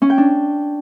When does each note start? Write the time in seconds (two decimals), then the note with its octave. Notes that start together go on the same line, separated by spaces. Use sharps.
0.02 C#4
0.10 G5
0.18 D4